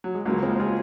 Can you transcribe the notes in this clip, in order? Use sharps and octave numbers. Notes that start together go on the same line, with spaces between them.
F#3
G#3
C#2 C#3 F3 F#3 A#3
G#3 C4
F4 G#4